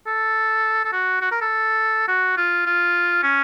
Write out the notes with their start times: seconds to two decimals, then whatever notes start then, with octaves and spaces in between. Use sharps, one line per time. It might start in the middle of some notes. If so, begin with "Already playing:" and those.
0.07 A4
0.85 A4
0.93 F#4
1.22 F#4
1.31 A#4
1.41 A4
2.08 F#4
2.37 F4
2.66 F4
3.23 C#4